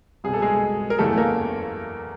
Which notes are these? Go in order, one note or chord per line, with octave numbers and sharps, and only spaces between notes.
C2 B2 G#4
A4
G#3 G#4
A#4
F#1 E2 C#3 E3 A3 A4
A#3 A#4